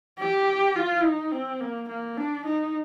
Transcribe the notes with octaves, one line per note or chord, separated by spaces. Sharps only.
G4
F4
D#4
C4
A#3
A#3
D4
D#4